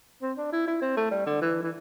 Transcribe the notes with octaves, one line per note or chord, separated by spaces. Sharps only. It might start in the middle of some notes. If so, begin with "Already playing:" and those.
C4
D4
E4
E4
C4
A3
G3
D3
E3
E3